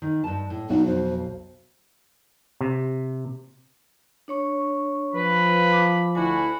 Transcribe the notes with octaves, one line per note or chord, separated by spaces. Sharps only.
D#3
G2 A5
A2
B1 D4 D#4 F#4
F2 C5
C3
D4 C#5 C#6
F3 B4 B5
D6
D2 E4 F#4 G#5